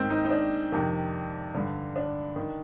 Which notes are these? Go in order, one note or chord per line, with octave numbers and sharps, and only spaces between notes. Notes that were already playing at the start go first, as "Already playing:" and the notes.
Already playing: G#2 D#3 C4
D#4
D#4
D4
F2 C3 D#3
G2 D3
D4
D#3